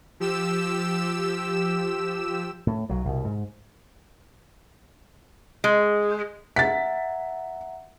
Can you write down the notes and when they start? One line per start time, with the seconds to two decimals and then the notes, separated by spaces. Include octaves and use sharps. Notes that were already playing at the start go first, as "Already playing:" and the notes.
0.20 F3 G4 E6 E7
2.67 A2
2.89 B1 F#3
3.05 C2 B2
3.25 G#2
5.64 G#3
6.56 E5 F#5 A#5 A6 B6